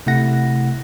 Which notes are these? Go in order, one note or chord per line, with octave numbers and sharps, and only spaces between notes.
C3 A3 E4 F#5 A#6